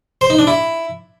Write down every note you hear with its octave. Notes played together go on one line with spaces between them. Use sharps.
C5
D#4
D4
E4